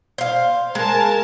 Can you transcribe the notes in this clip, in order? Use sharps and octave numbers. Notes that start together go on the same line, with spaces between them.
C5 F5
G#3 A#4 G#5 A5